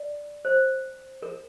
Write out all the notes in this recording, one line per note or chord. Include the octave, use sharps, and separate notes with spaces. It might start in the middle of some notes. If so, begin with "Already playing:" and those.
Already playing: D5
C5
A#4